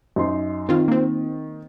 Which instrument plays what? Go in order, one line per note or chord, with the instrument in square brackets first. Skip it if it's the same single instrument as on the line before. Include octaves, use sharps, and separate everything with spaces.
[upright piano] F#2 D#4 C6
[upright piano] D#3 [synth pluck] C4 F4
[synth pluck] A#3 C4